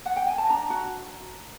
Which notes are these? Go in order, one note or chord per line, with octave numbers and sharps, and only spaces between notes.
F#5
G5
G#5
A5
D4 A#5
F#4